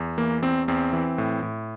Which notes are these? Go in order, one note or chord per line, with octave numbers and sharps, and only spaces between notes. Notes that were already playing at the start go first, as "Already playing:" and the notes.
Already playing: E2
E3 A#3
E2 C4
E2 C4
E3
A2
A2